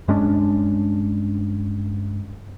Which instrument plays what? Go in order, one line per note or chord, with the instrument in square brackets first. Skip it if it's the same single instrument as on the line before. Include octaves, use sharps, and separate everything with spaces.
[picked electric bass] G2 G#3 C#4 D4